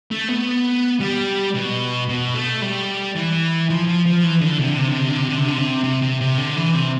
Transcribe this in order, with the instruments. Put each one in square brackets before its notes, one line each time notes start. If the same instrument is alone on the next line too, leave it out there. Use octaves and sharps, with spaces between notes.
[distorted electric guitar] A3
B3
G3
B2
B2
A3
G3
E3
F3
F3
F3
E3
D3
C3
D3
C3
D3
C3
D3
C3
D3
C3
D3
C3
C3
C3
C3
D3
E3
C3